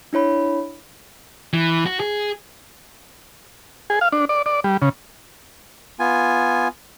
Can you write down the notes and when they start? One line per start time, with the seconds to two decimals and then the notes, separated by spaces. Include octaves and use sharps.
0.13 D4 E4 C#5 B5
1.54 E3
1.86 F#4
2.00 G#4
3.90 G#4
4.01 F5
4.12 D4
4.29 D5
4.46 D5
4.64 G3
4.82 C#3
5.99 B3 F4 G#5